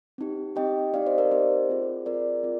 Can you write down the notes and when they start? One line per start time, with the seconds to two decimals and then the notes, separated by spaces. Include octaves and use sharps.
0.18 C4 D#4 G4
0.56 C4 D#4 G4 D#5 G5
0.94 C4 D#4 G4 D5 F5
1.06 C5 D#5
1.18 A#4 D5
1.31 C4 D#4 G4 C5
1.69 C4 F4 G#4
2.06 C4 F4 G#4 A#4 D5
2.43 C4 F4